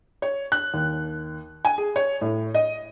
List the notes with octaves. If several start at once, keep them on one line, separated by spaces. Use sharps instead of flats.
C#5
F#6
D#2
G#5
G#4
C#5
A2
D#5